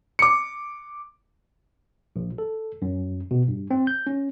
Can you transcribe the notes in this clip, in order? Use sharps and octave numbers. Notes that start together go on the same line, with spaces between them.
D6 C#7
A#1
A4
F#2
B2
G2
C4
G6
C#4